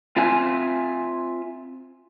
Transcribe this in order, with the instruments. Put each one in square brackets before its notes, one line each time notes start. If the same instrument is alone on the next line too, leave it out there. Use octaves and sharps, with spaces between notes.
[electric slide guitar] C4 F4 E5 G#5